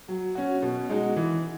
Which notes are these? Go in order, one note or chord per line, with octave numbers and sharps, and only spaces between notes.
F#3
C#4 F#4
B2
G#3 D#4 F#4
E3